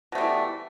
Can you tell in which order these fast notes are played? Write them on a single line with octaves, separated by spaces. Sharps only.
B2 A3 G3 E3